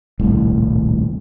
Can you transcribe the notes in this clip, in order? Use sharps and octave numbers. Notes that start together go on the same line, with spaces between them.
D#1 C2 A2